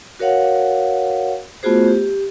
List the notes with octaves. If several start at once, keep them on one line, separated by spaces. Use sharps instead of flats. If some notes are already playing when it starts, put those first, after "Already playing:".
F#4 A#4 C#5 F5 F#5
A3 B3 F4 F#4 G#4 C5
G4